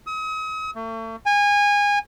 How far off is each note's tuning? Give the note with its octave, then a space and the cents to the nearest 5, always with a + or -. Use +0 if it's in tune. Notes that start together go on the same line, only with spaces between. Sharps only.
D#6 +40
A3 +40
G#5 -25